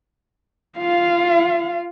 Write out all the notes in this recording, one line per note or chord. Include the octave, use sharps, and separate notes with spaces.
F4 F5